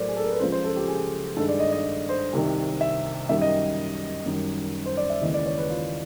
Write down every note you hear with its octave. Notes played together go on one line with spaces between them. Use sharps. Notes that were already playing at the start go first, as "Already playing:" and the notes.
Already playing: A2 F#3 A4 A#4 C5 D5
G#4
A4
A#4
B4
C#2 C#3 F3 C5
C5
A4
G4
G#4
G2 D#3 G#3 A4
D5
D#5
D#5
C5
C2 C3 D#3
E5
F#2 D#3 G3 E5
D#5
F#2 D#3 G3
C5
D5
E5
D#2 C#3 E3 G#3 D#5
D5
C#5
B4
F4